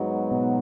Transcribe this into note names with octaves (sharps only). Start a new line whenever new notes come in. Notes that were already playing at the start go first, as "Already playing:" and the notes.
Already playing: G#2 F#3 B3 D#4 F#4
B2